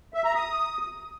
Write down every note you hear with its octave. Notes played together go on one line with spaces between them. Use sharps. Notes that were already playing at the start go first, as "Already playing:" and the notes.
E5
A#5
D#6